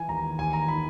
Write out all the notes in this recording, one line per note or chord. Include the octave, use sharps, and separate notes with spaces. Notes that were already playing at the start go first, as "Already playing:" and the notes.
Already playing: E3 G#5
D#2 A#5
D#2 G#5
A#5
D#3 B5